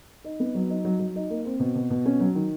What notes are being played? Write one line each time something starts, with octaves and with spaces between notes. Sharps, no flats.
D#4
B3
F#3
D#4
F#3
F#3
D#4
A#3
C4
B2
B2
B2
C#4
F#3
D#3